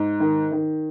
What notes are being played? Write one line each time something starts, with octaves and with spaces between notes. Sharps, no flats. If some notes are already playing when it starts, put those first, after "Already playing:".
Already playing: G#2
D#3
D#3